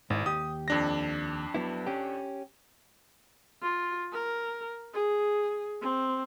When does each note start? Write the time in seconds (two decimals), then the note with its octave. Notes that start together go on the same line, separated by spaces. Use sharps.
0.10 G#1 G#2 E4
0.26 D#2 G4 D#6
0.68 F2 D4 A#6
1.54 F#3 B3 E4
1.87 C#4 G4
3.62 F4
4.13 A#4
4.93 G#4
5.81 C4